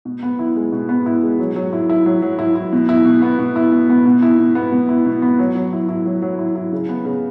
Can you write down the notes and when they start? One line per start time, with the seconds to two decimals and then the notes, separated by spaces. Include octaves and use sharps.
0.05 B2
0.23 B3
0.39 E4
0.56 G#3
0.72 B2
0.89 B3
1.06 E4
1.23 G#3
1.39 F#3
1.56 F#3
1.73 E4
1.89 E4
2.06 F#3
2.22 F#3
2.39 E4
2.55 E4
2.72 B2
2.89 E4
3.05 B2
3.22 B3
3.39 B2
3.56 E4
3.72 B2
3.90 B3
4.05 B2
4.22 E4
4.39 B2
4.55 B3
4.72 B2
4.89 E4
5.06 B2
5.22 B3
5.39 F#3
5.55 F#3
5.73 E4
5.89 E4
6.06 F#3
6.22 F#3
6.39 E4
6.55 E4
6.72 C#3
6.89 B3
7.05 C#3